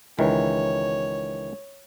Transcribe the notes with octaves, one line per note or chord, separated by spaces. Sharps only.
C#2 D#3 E3 C#5